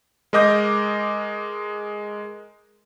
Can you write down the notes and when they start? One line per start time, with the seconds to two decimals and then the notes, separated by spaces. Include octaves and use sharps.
0.33 G#3 A#4 D#5 D6 G6 A#6